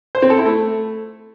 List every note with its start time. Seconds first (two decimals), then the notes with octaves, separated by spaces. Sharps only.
0.15 C5
0.22 C4
0.30 A4
0.38 E4
0.46 A3